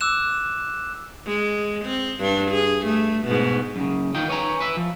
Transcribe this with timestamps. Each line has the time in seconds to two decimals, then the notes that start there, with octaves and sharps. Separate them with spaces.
0.01 D6 E6 F#6 E7
1.26 G#3
1.85 C4
2.19 G2 D4
2.51 G#4
2.86 A3
3.26 G#2 B2
3.76 F#2 C#3
4.15 D#3 D#4 F4 G5
4.28 B4 C#5 D#5 G#5 A#5
4.60 B4 E5
4.77 F3